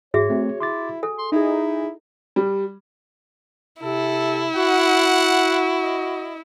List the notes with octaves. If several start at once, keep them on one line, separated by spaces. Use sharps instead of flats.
G#2 F#4 G#4 C#5 E5
A3 C4
E4 C6 D6 A6
A4 G#5
C6
D#4 E4 G#4
G3
C3 E4 A4
F#4 F#5
D#5